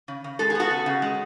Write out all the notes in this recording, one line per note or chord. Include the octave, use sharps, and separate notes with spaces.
C#3
C#3
G#3 A4
G#4
B3 F#4 A4
C#3
C#3
G#3